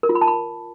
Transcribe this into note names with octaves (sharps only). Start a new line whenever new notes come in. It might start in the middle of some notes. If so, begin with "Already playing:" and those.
A#4
F4
B5
A5
B5